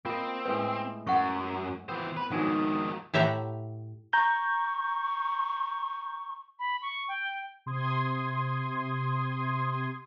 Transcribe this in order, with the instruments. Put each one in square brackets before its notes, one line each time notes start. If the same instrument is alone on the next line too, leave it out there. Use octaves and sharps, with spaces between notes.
[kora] A#3 D#5 [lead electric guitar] C4 [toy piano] F4
[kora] A2 G#3 G5 [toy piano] B4
[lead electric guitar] F#2 [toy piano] F#5 C#6
[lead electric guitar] E3 C5 [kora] B3 C4
[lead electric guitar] B4 [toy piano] B5
[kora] G#2 F#3 [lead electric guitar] D#3 F3 [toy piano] D4 G#5
[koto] A2 G4 E5 F#5 A#5
[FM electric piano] A#5 G6 [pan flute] C#6
[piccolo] B5
C#6
G5
[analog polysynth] C3 C6 D#6 G#6